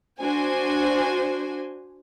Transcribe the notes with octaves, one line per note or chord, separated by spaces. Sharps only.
D4 F#4 C5 G#5